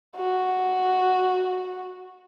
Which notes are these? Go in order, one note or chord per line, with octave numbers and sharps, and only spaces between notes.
F#4